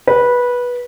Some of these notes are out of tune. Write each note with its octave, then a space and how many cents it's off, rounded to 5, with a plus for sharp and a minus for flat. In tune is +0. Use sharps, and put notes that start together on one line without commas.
B4 -15